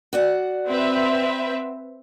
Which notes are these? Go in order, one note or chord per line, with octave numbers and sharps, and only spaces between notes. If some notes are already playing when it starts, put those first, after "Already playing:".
F#4 D5 F#5
C4 B4 E5